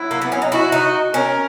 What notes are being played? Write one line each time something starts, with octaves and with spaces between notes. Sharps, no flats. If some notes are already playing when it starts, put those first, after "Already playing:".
Already playing: F#3 E4
A#3
B3
C#4
D#4
E4 F#4
D#4
C#4 A#4